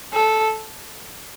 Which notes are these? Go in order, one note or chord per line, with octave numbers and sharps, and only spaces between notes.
A4